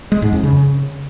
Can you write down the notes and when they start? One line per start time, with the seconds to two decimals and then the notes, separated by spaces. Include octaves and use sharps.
0.12 G#3
0.22 G#2
0.33 F2
0.43 C#3